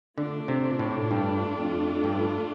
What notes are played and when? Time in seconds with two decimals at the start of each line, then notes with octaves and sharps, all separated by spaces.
0.17 D3 A3 D4 F4
0.48 C3
0.79 A2
1.11 G2
1.58 F2
2.04 G2